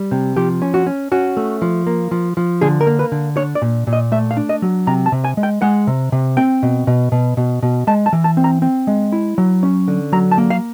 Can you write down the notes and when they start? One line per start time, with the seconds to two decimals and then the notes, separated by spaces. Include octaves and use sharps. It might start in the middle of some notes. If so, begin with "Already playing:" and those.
Already playing: G3
0.11 C3
0.36 F3 G4
0.62 C#4
0.74 F#4
0.87 C#4
1.12 C#4 F#4
1.37 A3
1.62 F3
1.87 A#3
2.11 F3
2.37 F3
2.61 D3 G#4
2.81 A#4
2.87 A#3
2.99 B4
3.12 D3
3.37 D4 C#5
3.55 D5
3.62 A#2
3.87 A#2
3.93 D#5
4.12 A3 E5
4.31 F5
4.37 D4
4.49 D#5
4.62 F#3
4.87 C3 A#5
5.06 A5
5.12 C3
5.25 G#5
5.37 G#3
5.43 G5
5.62 G#3 F#5
5.87 C3
6.12 C3
6.37 C4 G5
6.63 B2
6.87 B2
7.12 B2
7.37 B2
7.63 B2
7.87 G#3 A5
8.06 A5
8.13 E3
8.24 A5
8.37 C4
8.44 A#5
8.62 C4
8.87 G#3
9.12 E4
9.38 F#3
9.63 C#4
9.88 D3
10.12 F#3 A#5
10.31 A5
10.38 A#3
10.50 F5